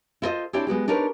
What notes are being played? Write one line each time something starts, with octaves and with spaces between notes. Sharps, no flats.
E4 F4 A4 C5 D#5
C4 D4 E4 G4 C#5 G5
G#3 B3 F#4 G4
D4 D#4 G4 A#4 B4 C#5